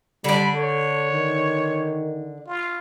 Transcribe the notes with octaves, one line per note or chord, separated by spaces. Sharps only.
D3 G3 D5 B5
A4 C#5
D#3
F4